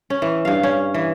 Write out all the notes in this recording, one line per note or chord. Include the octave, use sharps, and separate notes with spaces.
C#4
E3
G2 F5
C#4
E3